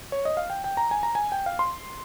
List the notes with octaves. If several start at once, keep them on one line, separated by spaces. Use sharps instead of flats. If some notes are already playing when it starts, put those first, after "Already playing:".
C#5
D#5
F5
G5
G5
A#5
G#5
A#5
G#5
G5
F5
C6